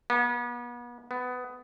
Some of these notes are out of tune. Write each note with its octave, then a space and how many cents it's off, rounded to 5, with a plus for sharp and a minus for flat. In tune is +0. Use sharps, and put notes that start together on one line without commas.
B3 -40
B3 +15